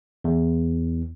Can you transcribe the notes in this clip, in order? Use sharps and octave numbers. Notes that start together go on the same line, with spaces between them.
E2